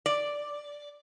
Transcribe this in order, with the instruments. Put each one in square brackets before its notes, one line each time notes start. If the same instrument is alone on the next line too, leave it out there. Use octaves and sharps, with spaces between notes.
[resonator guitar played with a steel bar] D5